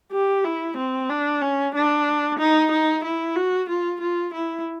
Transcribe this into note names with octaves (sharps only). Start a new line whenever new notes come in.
G4
E4
C4
D4
C#4
D4
D#4
D#4
E4
F#4
F4
F4
E4